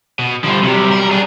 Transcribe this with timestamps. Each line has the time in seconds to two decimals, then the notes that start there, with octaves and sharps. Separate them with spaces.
0.19 B2
0.44 D3 F3 G3
0.63 C3 F#3 G3
0.92 A#4
1.11 D4 G#4